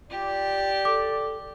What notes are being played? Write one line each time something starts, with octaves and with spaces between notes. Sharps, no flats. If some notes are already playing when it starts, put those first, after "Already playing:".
F4 G4 D5
A4 D6